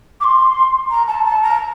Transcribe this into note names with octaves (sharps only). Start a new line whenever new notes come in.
D6
C6
A#5
A5
A5
A#5